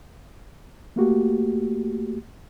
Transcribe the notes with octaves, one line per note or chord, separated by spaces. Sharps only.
A3 A#3 F#4 G4